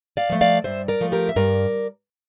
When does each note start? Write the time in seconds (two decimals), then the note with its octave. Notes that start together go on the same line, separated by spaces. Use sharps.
0.17 D5 F5
0.30 F3 A3
0.41 D5 F5
0.64 G2 C5 E5
0.88 A#4 D5
1.01 F3 A3
1.12 G4 A#4
1.29 E5
1.36 G2 A#4 D5